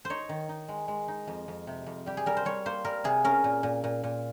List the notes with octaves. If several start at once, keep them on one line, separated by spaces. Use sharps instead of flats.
C5
D#4 C#5
D#3
D#4
G#3
G#3
D#4
F2
F2
C3
F2
G3 G4
G#4
G3 A#4
C5
G3 C#5
A#3 C5
G3 A#4
C3 G#4
C#4 A#4
A#2
A#2
A#2
A#2